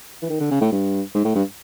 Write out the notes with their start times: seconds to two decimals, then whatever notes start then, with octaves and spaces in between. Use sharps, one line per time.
0.22 E3
0.30 D#3
0.40 D3
0.51 C#3
0.61 A2
0.72 G2
1.15 G#2
1.24 A2
1.35 G2